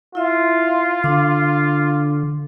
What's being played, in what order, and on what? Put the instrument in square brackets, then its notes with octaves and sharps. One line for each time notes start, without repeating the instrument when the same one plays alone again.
[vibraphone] E4 E5 [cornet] F4
[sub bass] D3 [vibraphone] D4 D6